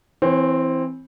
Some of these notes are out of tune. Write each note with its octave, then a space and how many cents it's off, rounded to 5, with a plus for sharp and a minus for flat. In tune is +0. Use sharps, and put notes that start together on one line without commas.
E3 +0 C4 +0 C#5 -40